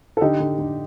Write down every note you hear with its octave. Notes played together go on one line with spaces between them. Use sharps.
A4
D3 D#4 G4
D3
D3